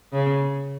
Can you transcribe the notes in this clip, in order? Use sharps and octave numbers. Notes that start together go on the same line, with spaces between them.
C#3